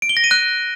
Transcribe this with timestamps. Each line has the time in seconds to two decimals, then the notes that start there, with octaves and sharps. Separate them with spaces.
0.02 D7
0.09 G7
0.17 A#6
0.24 D#7
0.31 F#6